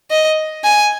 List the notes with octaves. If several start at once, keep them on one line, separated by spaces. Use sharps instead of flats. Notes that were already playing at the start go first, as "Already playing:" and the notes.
D#5
G#5